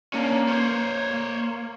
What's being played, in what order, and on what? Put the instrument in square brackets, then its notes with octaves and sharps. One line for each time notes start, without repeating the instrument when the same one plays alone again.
[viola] A#3 [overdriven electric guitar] C#4 D4
[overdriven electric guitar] C5 C#5
[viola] A#3